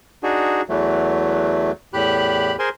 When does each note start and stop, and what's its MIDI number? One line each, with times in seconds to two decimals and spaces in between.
0.23 0.62 62
0.23 0.62 63
0.23 0.62 66
0.23 0.62 68
0.69 1.72 40
0.69 1.72 52
0.69 1.72 54
0.69 1.72 57
1.93 2.56 40
1.93 2.56 45
1.93 2.56 67
1.93 2.56 83
1.93 2.56 90
2.59 2.69 68
2.59 2.69 70
2.59 2.69 72
2.59 2.69 80
2.59 2.69 84